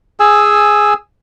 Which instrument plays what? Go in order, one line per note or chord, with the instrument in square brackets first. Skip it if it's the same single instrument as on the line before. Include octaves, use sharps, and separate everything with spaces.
[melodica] G#4 G#5 E6